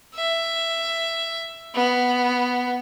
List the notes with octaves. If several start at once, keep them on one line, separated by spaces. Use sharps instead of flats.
E5
B3